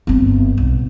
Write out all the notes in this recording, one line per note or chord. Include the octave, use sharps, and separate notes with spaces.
G1 C4
B1